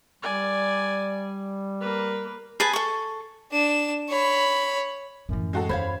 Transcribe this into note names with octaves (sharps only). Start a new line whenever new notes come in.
G3 D5 G#5
A#3 B4
G#4 B4 G#5 A5
A4 C#6
D4 E7
C#5 B5
F#2 A2 E3
G#3 F#4 A4
E2 C5 C#5 F5 B5 G#6